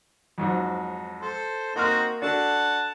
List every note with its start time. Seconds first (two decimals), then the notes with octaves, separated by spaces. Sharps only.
0.38 F2 G#2 F#3
1.22 A4 C5
1.76 A#3 C4 D#4 F#4 F6
2.22 D4 F#4 A4 F#5 A5